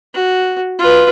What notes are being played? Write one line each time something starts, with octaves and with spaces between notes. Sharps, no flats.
F#4
F4 B4